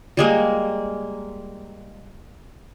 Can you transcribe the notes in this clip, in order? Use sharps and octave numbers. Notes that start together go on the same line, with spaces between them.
G3 G#3 A#3